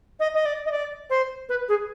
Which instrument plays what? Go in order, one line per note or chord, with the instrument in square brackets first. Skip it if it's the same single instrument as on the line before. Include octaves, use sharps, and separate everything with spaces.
[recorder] D#5
D#5
D5
D#5
D5
C5
B4
G#4